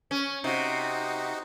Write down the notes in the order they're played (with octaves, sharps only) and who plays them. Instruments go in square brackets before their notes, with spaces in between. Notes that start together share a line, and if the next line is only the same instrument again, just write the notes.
[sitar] C#4
[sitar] C3 [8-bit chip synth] D#4 F#4